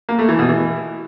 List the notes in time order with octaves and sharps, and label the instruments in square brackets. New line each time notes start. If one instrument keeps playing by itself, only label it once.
[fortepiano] A#3
A3
E3
B2
E3